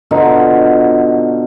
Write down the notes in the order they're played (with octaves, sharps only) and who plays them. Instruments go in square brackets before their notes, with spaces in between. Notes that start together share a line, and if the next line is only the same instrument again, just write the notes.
[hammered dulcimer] B2 D3 D#4 F4